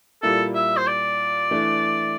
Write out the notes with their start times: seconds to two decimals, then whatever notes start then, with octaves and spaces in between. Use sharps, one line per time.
0.22 A#2 G3 A#3 E4 A4
0.55 E5
0.77 C5
0.87 D5
1.51 E3 A3 D4